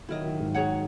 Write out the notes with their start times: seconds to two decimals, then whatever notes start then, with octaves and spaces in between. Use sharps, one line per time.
0.09 D#3 F#3 E4 A#4 D#5
0.24 D#3 F#3
0.40 G#2
0.54 G#4 C#5 F#5 A#5